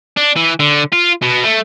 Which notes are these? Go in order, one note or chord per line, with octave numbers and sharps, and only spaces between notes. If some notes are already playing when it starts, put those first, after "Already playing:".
D4
E3
D3
F4
B2
A3